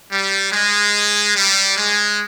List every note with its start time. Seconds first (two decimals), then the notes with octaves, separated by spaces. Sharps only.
0.11 G3
0.52 G#3
1.36 G3
1.77 G#3